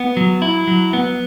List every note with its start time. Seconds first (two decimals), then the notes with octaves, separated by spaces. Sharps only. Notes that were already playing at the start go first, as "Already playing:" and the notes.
Already playing: B3
0.17 F#3
0.42 E4
0.67 F#3
0.93 B3